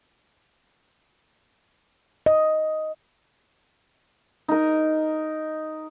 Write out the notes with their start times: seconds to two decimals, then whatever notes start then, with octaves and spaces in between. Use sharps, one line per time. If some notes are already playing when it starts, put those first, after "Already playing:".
2.26 D#5
4.48 D#4 A#4